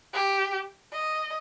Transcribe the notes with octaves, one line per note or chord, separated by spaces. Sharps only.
G4
D#5